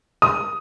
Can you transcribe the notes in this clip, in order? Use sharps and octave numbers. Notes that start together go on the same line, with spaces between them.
D#6